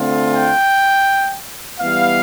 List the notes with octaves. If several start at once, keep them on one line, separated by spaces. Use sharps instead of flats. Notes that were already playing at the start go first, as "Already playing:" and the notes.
Already playing: D3 A3 C4 F4
G5
E3 G3 B3 F5